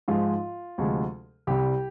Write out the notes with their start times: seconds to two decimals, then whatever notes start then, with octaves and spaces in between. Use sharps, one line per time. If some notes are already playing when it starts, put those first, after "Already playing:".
0.08 G#2 F3 G#3 F4
0.78 D2 C3 F3 G#3
1.47 C2 C3 G3 G4